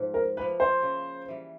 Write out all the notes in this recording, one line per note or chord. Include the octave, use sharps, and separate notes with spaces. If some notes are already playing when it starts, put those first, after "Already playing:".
Already playing: G#2 F3
A#4
F3 A#3 B4
C5
C#3
E3 G3